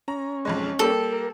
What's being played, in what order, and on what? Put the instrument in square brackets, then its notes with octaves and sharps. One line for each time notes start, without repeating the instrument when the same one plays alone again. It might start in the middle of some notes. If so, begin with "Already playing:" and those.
[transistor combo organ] C#4 [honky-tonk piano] A#5
[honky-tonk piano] B1 F2 G#3
[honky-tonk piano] G3 A#3 G4 [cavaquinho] A4
[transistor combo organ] A#4